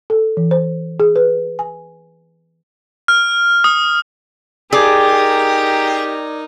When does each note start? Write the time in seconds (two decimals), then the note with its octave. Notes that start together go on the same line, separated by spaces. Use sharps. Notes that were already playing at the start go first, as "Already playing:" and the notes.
0.10 A4
0.37 E3
0.51 C5
1.00 G#4
1.16 B4
1.59 G#5
3.08 F6
3.64 D#6
4.73 D#4 G4 G#4 A#4 D5 D6 G#6